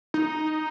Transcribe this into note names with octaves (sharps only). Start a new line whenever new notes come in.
D#4